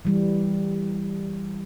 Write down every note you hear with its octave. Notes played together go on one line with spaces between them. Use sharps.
E3 G3